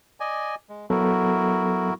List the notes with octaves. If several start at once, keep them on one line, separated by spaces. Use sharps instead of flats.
D5 D#5 G#5
G#3
F#3 B3 E4 F#4 A4 A#4